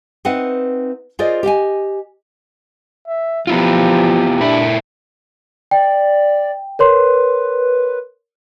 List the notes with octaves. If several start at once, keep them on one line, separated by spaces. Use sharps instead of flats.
C4 D#4 B4 E5 F#5
F4 G#4 A#4 C5 D5 D#5
G4 D#5 G5 G#5
E5
F3 B3 E4 F4 G4
A#2 D4 E4 E5
D5 G5
A#4 B4 C#5 C6